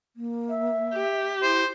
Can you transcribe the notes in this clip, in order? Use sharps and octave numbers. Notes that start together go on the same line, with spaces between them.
A#3
E5
G4
E4 C5